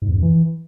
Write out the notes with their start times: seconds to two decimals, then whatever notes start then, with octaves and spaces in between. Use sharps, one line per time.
0.02 G#2
0.09 E2
0.15 F#2
0.22 E3